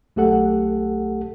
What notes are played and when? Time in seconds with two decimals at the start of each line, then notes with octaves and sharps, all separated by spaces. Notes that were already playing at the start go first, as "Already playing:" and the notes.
0.16 B1 A3 G4 A4 F#5